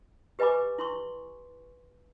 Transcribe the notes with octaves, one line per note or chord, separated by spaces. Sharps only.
G4 B4 D#5 G#5 B5 D6
E4 C6 C#6